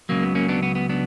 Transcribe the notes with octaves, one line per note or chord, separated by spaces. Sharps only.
C#2 C#3 F#3 A#3
B3
A#3 C#4
B3 D4
B3
B3
B3 D4